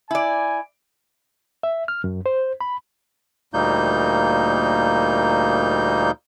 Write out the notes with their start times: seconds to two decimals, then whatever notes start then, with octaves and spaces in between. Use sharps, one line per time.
0.11 E4 D5 G#5
1.63 E5
1.88 F6
2.04 F#2
2.26 C5
2.61 B5
3.54 D2 A#2 G3 A#3 D#4 G6